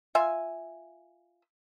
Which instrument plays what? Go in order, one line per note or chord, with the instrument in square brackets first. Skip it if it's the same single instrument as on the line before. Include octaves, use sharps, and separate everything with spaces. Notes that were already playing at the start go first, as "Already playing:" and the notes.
[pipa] F4 E5 G#5